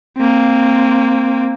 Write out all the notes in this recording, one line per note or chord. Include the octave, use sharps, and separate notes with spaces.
A#3 C4